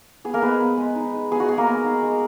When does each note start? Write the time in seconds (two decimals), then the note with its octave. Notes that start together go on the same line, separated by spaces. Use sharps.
0.25 B3 G#4
0.34 A#3 A#4
0.42 G#3 B3 B4
0.60 B3
0.78 G#3
0.95 D#4
1.13 G#3
1.31 B3 G#4
1.40 F#4
1.49 G#3 G#4
1.58 A#3 A#4
1.67 B3
1.84 D#4
2.02 G#3